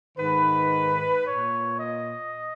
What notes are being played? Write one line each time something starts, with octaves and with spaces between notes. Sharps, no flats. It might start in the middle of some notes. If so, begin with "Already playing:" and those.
G#2 D#3 B4
A#2 C#5
D#5